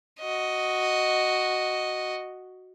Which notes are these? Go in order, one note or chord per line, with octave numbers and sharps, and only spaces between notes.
F#4 D#5